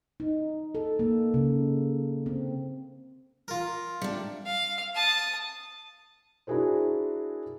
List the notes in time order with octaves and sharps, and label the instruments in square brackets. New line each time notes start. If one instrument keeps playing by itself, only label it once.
[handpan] D#4
A4
A#3
C#3
C4
[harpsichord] F4 A#4
[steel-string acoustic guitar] G3 D4
[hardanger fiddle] F5
A5 D#6
[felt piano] D4 E4 F#4 G#4 A#4 C5